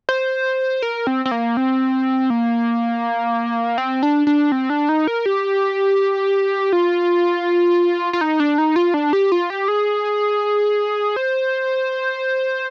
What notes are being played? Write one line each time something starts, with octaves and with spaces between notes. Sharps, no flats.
C5
A#4
C4
C4
A#3
C4
A#3
C4
D4
D4
C4
D4
D#4
A#4
G4
F4
F4
D#4
D4
D#4
F4
D4
G4
F4
G4
G#4
C5